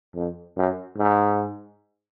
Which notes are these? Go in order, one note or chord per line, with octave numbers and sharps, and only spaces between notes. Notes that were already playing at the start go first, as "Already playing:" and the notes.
F2
F#2
G#2